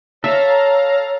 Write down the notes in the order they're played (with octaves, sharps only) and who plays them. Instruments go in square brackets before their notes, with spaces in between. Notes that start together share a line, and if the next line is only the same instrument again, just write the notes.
[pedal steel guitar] A4 [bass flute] C#5 [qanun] E5 [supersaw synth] F5 A#5